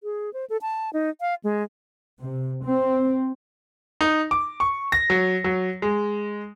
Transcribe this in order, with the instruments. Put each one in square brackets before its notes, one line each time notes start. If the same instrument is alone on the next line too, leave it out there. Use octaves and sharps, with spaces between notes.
[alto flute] G#4
C5
A4
A5
D#4
F5
G#3
[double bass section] C3
C4
[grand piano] D#4
D6
C#6
A#6
F#3
F#3
G#3